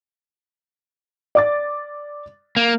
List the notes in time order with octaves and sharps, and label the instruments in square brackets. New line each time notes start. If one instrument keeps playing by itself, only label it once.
[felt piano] D5 D6 A6
[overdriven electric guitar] A#3